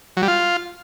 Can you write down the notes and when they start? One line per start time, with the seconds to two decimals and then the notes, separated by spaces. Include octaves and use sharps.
0.17 F#3
0.22 G3
0.28 F4